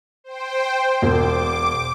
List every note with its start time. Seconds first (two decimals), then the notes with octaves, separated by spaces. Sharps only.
0.24 C5 G5
1.02 E1 D6